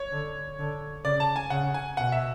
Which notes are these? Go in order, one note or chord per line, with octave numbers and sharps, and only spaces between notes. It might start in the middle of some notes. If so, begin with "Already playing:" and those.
Already playing: C#5
D3
D3
C#3 D5
A5
G#5
C#3 F#5
G#5
B2 F#5
E5